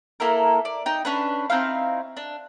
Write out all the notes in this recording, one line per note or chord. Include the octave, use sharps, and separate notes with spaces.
A#3 E4 A4 A#4
D5
D#4 G5
C#4 D4 B4
C4 D#4 E4 F5
D4